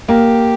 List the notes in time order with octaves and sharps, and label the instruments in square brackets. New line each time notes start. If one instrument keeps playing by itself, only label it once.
[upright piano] A#3 [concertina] G4